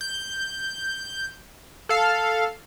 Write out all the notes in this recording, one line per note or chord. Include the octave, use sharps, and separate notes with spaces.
G6
A4 F5